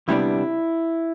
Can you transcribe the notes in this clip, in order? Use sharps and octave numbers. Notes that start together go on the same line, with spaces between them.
D2 C3 G3 B3 D4 E4